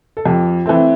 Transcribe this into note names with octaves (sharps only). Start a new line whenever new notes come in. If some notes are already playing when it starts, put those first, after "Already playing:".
A4
F2 G4
E3 A3 C4